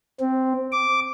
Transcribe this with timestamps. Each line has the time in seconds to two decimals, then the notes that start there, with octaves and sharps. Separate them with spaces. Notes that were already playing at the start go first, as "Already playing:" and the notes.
0.20 C4
0.72 D6